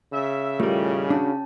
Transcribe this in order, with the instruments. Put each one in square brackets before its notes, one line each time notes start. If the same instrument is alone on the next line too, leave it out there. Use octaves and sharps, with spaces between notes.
[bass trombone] C#3 [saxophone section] E5
[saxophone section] A2 D#3 G3 [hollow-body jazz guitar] A3 A#4 [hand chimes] F4
[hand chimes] C#4 A5 [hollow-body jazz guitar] D4 F#4